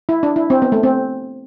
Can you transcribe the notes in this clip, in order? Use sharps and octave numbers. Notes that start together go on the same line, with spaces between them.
E4
D4
E4
C4
B3
A3
C4